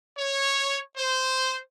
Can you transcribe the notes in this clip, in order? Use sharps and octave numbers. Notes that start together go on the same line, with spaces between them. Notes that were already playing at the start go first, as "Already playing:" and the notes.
C#5
C5